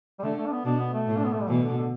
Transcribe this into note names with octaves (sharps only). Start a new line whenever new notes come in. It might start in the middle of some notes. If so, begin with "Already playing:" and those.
G3
D3 A3
A3
D4
B3
B2 D4
B3
A3
A2
D4
B3
A3
G3
B2 E3
D3
D3